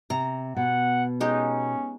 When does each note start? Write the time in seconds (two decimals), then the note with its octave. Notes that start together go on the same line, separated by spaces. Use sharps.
0.10 C3 A#5
0.56 B2 F#5
1.20 G#3 C#4 D#4 G4